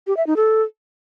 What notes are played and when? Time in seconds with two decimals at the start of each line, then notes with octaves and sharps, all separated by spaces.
0.07 G4
0.17 E5
0.27 D#4
0.36 A4